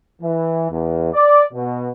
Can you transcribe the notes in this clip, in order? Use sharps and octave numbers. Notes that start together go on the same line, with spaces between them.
E3
E2
D5
B2